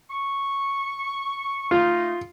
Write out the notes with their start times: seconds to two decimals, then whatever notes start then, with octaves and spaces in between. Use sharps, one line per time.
0.10 C#6
1.71 A3 D#4 F4